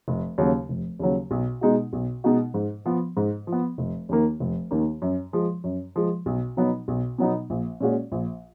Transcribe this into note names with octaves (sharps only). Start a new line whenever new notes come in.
F1
D#2 C#3 F#3
F1
D#2 C#3 F#3
B1
B2 G#3 D#4 F#4
B1
B2 G#3 D#4 F#4
G#2
F3 B3
G#2
F3
B3
F1
D#2 D#3 A#3
F1
D#2 D#3 A#3
F#2
F3 G#3
F#2
F3 G#3
B1
B2 F#3 B3 D#4
B1
B2 F#3 B3 D#4
A#1
A#2 G#3 C#4 F#4
A#1